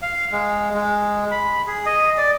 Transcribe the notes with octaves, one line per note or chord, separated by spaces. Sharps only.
F5
G#3
G#3
B5
G#4
D#5
D5